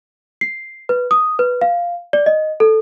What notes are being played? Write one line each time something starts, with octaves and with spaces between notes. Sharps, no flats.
C7
B4
D#6
B4
F5
D5
D#5
A4